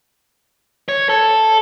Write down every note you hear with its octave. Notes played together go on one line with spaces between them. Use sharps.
C#5
A4